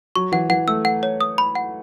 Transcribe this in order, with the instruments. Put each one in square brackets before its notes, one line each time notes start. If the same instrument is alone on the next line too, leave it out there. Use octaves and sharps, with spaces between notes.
[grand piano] F#3 [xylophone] C#6
[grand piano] E3 [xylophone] F#5
[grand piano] E3 [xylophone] F#5
[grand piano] A3 [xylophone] E6
[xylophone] F#5
C#5
D#6
B5
F#5